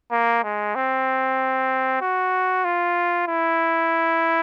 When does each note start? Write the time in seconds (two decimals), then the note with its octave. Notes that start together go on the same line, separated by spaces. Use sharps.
0.12 A#3
0.44 G#3
0.75 C4
2.02 F#4
2.64 F4
3.28 E4